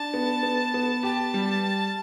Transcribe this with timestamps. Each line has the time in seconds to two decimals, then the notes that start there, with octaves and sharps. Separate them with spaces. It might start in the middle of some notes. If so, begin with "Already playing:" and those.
Already playing: D4 A5
0.14 B3
0.43 B3
0.74 B3
1.03 G4 A5
1.34 G3